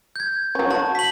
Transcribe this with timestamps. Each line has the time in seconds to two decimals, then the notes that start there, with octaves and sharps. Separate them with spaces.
0.16 G6 G#6
0.55 F#3 C#4
0.71 F#4 A5
0.95 B6 F#7